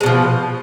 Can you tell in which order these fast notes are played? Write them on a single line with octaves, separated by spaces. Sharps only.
G#3 B2 F3